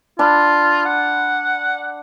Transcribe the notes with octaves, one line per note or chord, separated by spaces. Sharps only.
D4 F4 B5
F#5